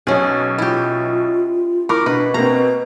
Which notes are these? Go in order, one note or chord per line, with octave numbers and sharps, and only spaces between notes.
B1 B2 C#4 G#4
E4 F4 G4
E4 A#4 B5 C#6 D6
B2 D4 B4
B2 A#3 C4 B4 A#5